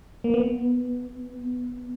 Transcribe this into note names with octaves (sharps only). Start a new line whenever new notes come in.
A#3
B3